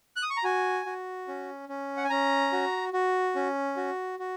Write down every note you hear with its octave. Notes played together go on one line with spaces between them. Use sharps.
F#6
D#6
C#6
A#5
F#4 G#5
F#4
C#4
C#4
F#5
G#5
C#4 A#5
F#4
F#4
C#4
F#4
F#4